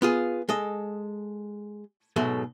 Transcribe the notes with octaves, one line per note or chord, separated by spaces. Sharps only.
B3 F4 G#4
G#3 A4 D#5
G#2 B2 F#3 G#3 A3